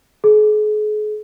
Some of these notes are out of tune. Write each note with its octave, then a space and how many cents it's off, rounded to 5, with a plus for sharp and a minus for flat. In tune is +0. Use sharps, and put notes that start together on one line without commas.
G#4 +40